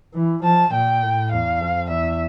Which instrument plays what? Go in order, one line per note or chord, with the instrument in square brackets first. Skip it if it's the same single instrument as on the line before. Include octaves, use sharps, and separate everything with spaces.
[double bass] E3
[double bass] F3 [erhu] A5
[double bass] A#2 [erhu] G5
[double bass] A2
[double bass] E2 [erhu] F5
[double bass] F2
[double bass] E2 [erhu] E5